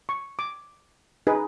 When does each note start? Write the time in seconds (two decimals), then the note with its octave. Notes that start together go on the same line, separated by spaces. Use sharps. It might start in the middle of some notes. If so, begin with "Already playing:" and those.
0.09 C#6
0.39 D6
1.27 D#4 G#4 B4